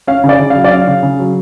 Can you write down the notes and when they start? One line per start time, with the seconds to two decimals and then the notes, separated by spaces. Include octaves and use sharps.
0.07 C#4 F5
0.24 C#3
0.29 D5
0.39 C#3
0.50 F5
0.55 F#3
0.64 D5
0.71 C#4 F5
0.87 C#3
1.03 C#3
1.19 F#3